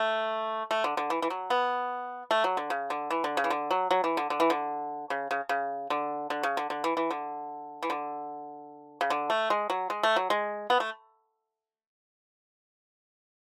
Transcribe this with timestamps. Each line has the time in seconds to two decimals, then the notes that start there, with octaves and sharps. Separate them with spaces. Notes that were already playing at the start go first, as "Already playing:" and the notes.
Already playing: A3
0.71 A3
0.84 D3
0.97 D3
1.10 E3
1.22 E3
1.30 F#3
1.50 B3
2.31 A3
2.44 F#3
2.57 D3
2.70 C#3
2.90 D3
3.10 E3
3.24 D3
3.37 C#3
3.44 E3
3.50 D3
3.71 F#3
3.91 F#3
4.04 E3
4.17 D3
4.30 D3
4.40 E3
4.50 D3
5.10 C#3
5.31 C#3
5.49 C#3
5.90 D3
6.30 D3
6.43 C#3
6.57 D3
6.70 D3
6.84 E3
6.97 E3
7.11 D3
7.83 E3
7.90 D3
9.01 C#3
9.10 D3
9.30 A3
9.50 G#3
9.70 F#3
9.90 G#3
10.03 A3
10.16 F#3
10.30 G#3
10.70 B3
10.80 A3